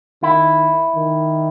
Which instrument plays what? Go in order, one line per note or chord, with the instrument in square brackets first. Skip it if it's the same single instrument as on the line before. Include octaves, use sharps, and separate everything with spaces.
[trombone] D#3 [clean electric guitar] E4
[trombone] D#3